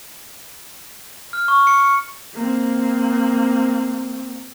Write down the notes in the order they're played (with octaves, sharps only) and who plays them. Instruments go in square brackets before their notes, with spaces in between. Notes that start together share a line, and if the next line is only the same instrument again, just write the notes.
[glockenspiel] F6
C#6
C#7
C#7
[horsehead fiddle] A#3 C4